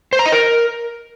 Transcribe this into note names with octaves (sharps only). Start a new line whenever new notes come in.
C5
A#5
D#5
A#4